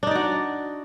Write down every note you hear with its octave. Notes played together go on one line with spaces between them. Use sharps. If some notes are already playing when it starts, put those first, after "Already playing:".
D4 D#4 F#4 D5